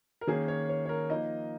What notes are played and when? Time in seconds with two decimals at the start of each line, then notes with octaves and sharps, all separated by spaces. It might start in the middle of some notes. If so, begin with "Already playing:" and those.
0.21 A#4
0.27 D#3 A#3 C#4 G#4
0.48 C#5
0.69 C#5
0.85 C#5
0.89 A#4
1.10 F3 A#3 D#4 D#5